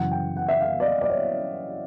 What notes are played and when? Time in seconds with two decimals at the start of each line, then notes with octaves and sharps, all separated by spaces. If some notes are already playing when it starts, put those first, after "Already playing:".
Already playing: F#2 C#3 E3 F#5
0.11 G5
0.37 F#5
0.48 E5
0.61 F5
0.80 D5
0.85 D#5
1.01 D5
1.10 C#5